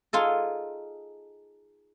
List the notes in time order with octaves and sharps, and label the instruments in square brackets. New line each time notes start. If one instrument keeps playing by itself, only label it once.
[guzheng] D#4 F4 G#4 A4